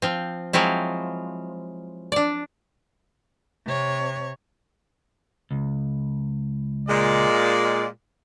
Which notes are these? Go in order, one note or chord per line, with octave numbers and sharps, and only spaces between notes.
F3 C4
F3 F#3 G#3 C4 E4
D4 D5
C3 C#5
C#2
A#2 G#3 D5